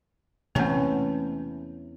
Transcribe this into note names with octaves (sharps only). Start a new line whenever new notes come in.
E2 C3 A3 A#3 C4 C#4 A5